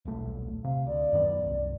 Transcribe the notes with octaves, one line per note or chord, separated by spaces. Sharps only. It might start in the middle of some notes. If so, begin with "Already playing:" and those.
D#1 B1 A3
C3 F5
D2 D5
F#2 D#3 B3
C2 F#2